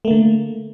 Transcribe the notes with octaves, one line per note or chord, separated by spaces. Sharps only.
D3 A3 A#3